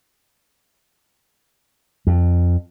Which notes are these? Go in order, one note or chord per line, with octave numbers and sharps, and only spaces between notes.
F2